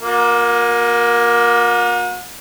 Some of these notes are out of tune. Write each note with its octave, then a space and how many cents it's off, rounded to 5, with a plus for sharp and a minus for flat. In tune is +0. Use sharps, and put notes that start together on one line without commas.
A#3 +15 F#4 -45